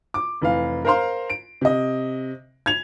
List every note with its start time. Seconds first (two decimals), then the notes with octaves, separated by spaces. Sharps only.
0.14 D6
0.41 F1 E3 F5
0.85 A#4 C5 F5 A#5 C6
1.30 D7
1.61 C3 D#5
2.66 G#6 F7